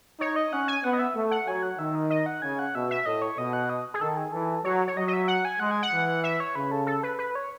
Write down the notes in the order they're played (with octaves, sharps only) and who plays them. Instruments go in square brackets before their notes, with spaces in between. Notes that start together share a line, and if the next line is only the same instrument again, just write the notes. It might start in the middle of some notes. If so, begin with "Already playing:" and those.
[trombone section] D#4 [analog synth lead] C#5
[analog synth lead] D#5
[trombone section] C#4 [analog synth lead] F#5
[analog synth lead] G#5
[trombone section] B3 [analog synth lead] F#5
[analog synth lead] D#5
E5
[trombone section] A3
[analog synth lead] F#5
[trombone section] F#3 [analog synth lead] G#5
[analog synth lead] F#5
[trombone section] D#3 [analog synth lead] E5
[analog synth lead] D#5
D#5
F#5
[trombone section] C#3 [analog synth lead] G#5
[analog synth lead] F#5
[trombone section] B2 [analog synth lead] E5
[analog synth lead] E5
[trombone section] A2 [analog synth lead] D#5
[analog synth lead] C#5
[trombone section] B2 [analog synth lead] D#5
[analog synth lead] F#5
D#5
G#4
[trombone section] D#3 [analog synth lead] A4
[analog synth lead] G#4
[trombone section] E3 [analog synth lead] A4
[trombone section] F#3 [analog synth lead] C#5
[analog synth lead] C#5
[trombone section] F#3 [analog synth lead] D#5
[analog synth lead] D#5
E5
F#5
G#5
[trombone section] G#3 [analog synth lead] F#5
[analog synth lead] G#5
F#5
[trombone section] E3
[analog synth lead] E5
C#5
[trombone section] C#3 [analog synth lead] B4
[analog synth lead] A4
A4
B4
B4
C#5